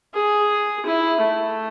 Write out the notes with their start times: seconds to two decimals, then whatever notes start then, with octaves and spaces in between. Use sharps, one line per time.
0.14 G#4
0.86 E4
1.22 A3